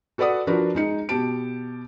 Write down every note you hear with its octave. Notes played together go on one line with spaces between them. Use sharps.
F#4 A4 B4 D5 F#5 D#6
F3 D4 F#4 A#4 B4
G#3 D#4 C#7
B2 G4 A5 D7